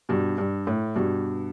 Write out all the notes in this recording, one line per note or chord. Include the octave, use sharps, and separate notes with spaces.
G2 B2
G2
A2
G2 B2